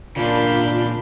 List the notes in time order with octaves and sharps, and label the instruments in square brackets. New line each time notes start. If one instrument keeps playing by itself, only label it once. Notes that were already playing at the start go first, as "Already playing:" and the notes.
[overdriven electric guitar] A#2 C#3 [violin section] D4 A#4 F5 [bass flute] F4 [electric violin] B5 G6